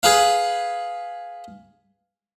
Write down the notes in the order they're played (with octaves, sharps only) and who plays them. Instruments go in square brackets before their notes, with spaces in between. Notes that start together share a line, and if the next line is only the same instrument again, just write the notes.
[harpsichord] G#4 B4 F5